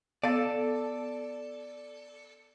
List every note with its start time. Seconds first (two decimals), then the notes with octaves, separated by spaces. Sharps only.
0.24 B3 A4 D5 F5 A6